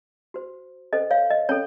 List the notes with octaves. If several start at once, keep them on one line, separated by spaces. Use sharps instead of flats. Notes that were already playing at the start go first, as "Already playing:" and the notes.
F#4 C5
C#4 A4 C5 D#5
C#5 F5
D#5
C#4 A4 C#5